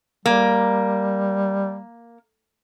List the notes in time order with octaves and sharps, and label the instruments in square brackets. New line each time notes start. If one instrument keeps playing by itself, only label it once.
[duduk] G3 [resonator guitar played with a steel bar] A#3